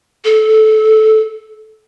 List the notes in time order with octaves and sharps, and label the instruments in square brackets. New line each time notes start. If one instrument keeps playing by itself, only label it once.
[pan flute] A4